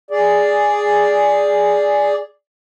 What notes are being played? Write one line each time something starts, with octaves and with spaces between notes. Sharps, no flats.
G#4 D5